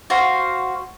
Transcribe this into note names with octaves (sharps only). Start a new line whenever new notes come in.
F#4 C5 F5